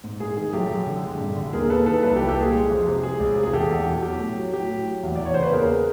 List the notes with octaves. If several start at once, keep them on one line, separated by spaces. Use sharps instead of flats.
G#2
G#2 G#4
D#3 G#4
F#2 G4 A4
F#2
D3
G#3
G2
D3
D#2 G#4 A#4
D#2 A4 B4
D#3 A4 B4
C2 A4 B4
G4 A4
C2
G4 A4
A#2 G#4
G#3
F2
C3
G#3 G#4
C#2
C3
G#4
E2 G4 A4
E2
B2
F#3 G4
A2
F#3
F#3 G4
A2
F#3
E2
E2 D5
C#5
C#3 C5
B4
D#2 G#4 A#4